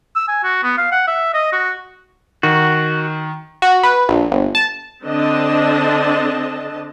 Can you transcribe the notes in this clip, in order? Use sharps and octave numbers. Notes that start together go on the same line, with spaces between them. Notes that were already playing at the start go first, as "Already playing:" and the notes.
E6
G#5
F#4
B3
F5
F#5
E5
D#5
F#4
D#3 F#4
F#4
B4
A#1
G1
A5
D3 C4 D4 D#5 A5